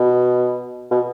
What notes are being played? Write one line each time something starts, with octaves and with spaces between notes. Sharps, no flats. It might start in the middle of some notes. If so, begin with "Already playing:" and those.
Already playing: B2
B2